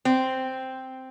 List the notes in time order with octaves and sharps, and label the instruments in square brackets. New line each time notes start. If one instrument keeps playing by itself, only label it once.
[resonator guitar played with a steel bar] C4